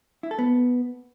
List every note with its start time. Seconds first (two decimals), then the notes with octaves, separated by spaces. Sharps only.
0.23 E4
0.31 A4
0.39 B3